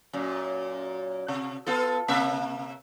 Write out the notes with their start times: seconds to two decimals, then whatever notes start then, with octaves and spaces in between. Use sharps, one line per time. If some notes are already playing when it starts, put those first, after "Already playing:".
0.13 F#2 A#2
1.28 C3
1.66 B3 F4 A4
2.08 C3 A#3 E5